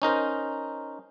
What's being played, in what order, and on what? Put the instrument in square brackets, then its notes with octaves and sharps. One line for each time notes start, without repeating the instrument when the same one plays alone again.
[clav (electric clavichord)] C#4 D#4 A#4 C5